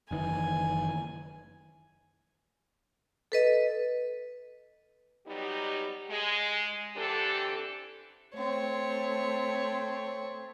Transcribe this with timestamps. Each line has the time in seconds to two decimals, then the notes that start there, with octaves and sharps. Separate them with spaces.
0.11 F#1 D#3 E3 G#5
3.32 A4 B4 D#5
5.26 F#3 G3 B3 D#4 G4
6.10 G#3
6.96 D3 E3 C4 D4 G4 A4
8.36 A3 C4 C#5